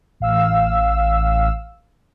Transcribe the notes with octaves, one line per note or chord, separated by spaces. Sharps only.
A1 F5 E6